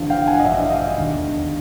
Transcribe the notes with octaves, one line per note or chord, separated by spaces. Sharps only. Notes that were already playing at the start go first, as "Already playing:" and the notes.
Already playing: A1 G2 D3 F3
F5 G5
F#5 G#5
D#5
A1 G2 D3 F3 D5 E5
D#5 F5
E1 D#2 D3